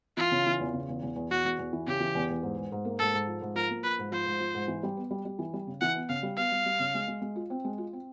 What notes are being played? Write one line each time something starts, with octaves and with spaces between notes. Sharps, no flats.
E3 F4
C#3
E3
E2
C#3
E2
E2
E2
E2 F#4
E2
E2
E3
C#3 G4
E3
E2
E2
G#2
G#2
G#2
A#3
G#2 A4
G#2
F3
G#2
F3 A#4
A#3
F3 B4
G#2
F3 C5
G#2
F3
G#2
E3
G3
B3
G3
G3
E3
G3
C#3
E3 F#5
B3
C#3 F5
G3
B3 F5
G3
G3
C#3
G#3
G#3
G#3
F4
C4
G#3
F4
C4